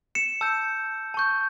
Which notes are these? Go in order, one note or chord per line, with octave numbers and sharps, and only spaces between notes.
C#7 E7
A5 E6 G6
A5 C#6 G6